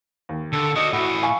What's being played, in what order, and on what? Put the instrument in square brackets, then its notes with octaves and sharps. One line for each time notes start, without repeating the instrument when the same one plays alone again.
[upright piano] D#2
[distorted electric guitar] D3 [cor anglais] A4
[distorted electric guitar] F#4 D5 [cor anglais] D#5
[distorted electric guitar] A2 E3 [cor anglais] E4 [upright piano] F#4
[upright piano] F5 G#5 C#6